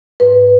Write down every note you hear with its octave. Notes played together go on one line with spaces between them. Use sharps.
G#2 B4